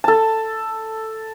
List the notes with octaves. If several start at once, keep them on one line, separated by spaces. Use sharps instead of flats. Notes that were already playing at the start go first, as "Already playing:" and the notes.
A4 A5